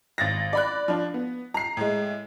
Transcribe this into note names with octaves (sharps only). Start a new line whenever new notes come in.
G#1 A6 A#6
D5 B5 F#6
F3 D4
B3
A#5 C7
A2 G#3